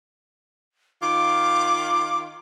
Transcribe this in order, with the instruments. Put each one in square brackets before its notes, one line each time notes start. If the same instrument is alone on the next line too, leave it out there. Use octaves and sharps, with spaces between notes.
[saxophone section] D#3 F4 [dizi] D6